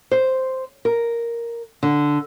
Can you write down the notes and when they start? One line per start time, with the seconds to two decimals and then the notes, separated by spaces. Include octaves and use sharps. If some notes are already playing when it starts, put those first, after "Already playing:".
0.11 C5
0.85 A#4
1.83 D3